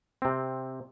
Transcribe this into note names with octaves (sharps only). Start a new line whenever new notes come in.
C3 C4